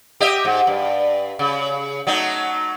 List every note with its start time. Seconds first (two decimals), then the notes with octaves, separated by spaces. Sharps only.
0.20 G4 D#5 E5
0.45 G#2
0.67 G2
1.39 C#3
2.07 F#3 A3 D#4